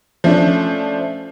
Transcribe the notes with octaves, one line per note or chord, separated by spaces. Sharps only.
F3 A3 C#4 D4